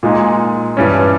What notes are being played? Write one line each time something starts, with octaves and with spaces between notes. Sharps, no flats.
A#2 G#3 D#4
G2 E3 G3 C#4